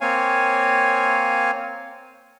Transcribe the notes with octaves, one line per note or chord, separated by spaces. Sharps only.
A#3 C4 C#5 F5 G#5